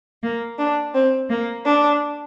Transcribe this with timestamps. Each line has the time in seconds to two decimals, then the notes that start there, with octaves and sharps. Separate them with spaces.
0.22 A#3
0.58 D4
0.93 C4
1.29 A#3
1.65 D4